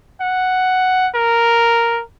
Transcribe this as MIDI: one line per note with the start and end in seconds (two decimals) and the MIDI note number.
0.21 1.09 78
1.15 2.02 70